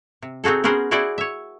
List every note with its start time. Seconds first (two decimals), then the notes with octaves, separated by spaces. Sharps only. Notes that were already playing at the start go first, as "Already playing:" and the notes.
0.22 C3
0.44 C4 D#4 F#4 G#4 A4
0.64 B3 C#4 F#4 G#4 A#4 C5
0.91 E4 F#4 G#4 C5 D5 E5
1.18 C#5 E5